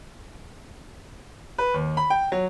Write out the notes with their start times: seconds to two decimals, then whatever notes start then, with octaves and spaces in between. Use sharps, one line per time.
1.58 B4
1.74 D#2
1.97 B5
2.10 G5
2.32 F#3